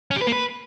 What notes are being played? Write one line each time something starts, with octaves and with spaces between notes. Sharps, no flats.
C#4
G4
B4
A#3
B4